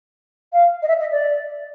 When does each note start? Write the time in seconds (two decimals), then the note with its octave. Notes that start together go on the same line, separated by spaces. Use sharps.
0.53 F5
0.82 D#5
0.88 E5
0.99 D#5
1.11 D5